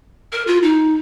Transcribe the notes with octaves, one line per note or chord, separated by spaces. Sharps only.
A#4
F4
D#4